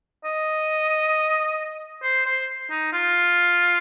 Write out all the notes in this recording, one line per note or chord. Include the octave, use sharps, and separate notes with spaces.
D#5
C5
C5
D#4
F4